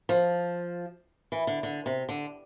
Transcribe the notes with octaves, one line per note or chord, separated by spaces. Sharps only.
F3
E3
D3
D3
C3
D3